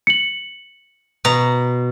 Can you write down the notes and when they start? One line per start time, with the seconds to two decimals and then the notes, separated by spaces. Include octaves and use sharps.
0.07 C#7 F#7
1.25 B2 A#5